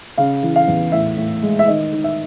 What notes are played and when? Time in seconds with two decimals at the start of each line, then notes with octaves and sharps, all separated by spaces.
0.17 C#3 F5
0.43 E3
0.56 F5
0.68 E2
0.92 A2 E5
1.17 A2
1.43 G#3
1.59 E5
1.67 D#3 D#5
1.92 D#3
2.04 E5